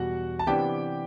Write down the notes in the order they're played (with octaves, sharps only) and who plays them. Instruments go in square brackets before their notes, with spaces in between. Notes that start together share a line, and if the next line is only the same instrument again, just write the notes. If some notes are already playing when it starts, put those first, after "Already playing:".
Already playing: [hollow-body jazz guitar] E2 B2 G3 [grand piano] F#4 F#5
[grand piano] A5
[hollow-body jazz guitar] C3 E3 B3 D4 [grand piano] G4 G5